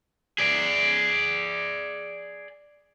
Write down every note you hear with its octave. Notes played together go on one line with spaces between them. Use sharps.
G#4 D5